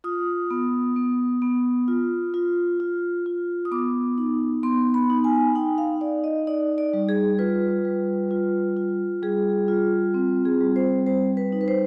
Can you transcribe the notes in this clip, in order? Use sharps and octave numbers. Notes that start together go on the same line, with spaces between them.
F4 D#6
B3
B3
B3
F4
F4
F4
F4
D#6
B3 D6
D#4
B3 C6
B5
D#4
G#5
D#4 G5
F5
D#4 D5
D#5
D#4 D5
D5
G3
G#4
F4 B4
G3
F4
F4
G3 G#4
F4
C4
G#4
G3
C5
G3 C5
B4
D#4
B4
C5